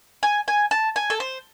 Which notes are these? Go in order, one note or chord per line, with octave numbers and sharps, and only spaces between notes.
G#5
G#5
A5
G#5
A4
C5